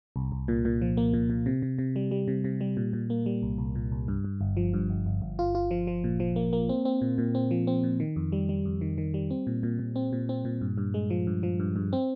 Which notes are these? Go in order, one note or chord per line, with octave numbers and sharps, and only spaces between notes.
C2
C2
A#2
A#2
F3
A#3
A#2
A#2
C3
C3
C3
G3
G3
C3
C3
G3
A#2
A#2
A#3
G3
C2
C2
A#2
C2
G2
G2
G1
F3
G2
G1
G1
G1
F4
F4
F3
F3
A#2
F3
A#3
A#3
C4
C4
A#2
A#2
C4
F3
C4
A#2
D#3
F2
G3
G3
F2
D#3
D#3
G3
C4
A#2
A#2
A#2
C4
A#2
C4
A#2
G2
G2
G#3
F3
G2
F3
G2
G2
C4